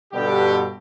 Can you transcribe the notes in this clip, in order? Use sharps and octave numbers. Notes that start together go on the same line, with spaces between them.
G2 B2 D3 G4